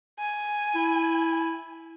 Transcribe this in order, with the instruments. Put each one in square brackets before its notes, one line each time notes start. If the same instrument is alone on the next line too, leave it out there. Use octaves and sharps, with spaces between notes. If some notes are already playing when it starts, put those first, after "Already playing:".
[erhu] G#5
[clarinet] E4